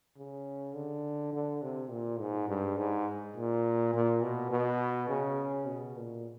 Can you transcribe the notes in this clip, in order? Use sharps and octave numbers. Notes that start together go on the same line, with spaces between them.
C#3
D3
D3
C3
A#2
G#2
G2
G#2
A#2
A#2
B2
B2
C#3
B2
A#2